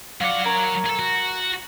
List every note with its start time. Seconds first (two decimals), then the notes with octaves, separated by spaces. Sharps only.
0.21 F#3 F4 F#4 D5 F#5
0.44 C#4 A#4 C#5
0.85 G#4 A4
0.99 F#4